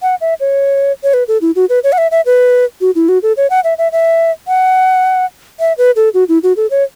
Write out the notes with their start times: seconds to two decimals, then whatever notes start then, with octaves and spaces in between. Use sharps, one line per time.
0.02 F#5
0.21 E5
0.40 C#5
1.03 C#5
1.14 B4
1.28 A4
1.41 E4
1.56 F#4
1.69 B4
1.84 C#5
1.92 F#5
1.98 E5
2.11 E5
2.26 B4
2.81 F#4
2.95 E4
3.09 F#4
3.23 A4
3.37 C#5
3.50 F#5
3.64 E5
3.78 E5
3.92 E5
4.48 F#5
5.60 E5
5.78 B4
5.96 A4
6.14 F#4
6.29 E4
6.43 F#4
6.57 A4
6.70 C#5